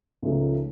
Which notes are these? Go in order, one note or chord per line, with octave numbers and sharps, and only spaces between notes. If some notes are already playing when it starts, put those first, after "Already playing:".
C#2 C#3 F3 A3 D#4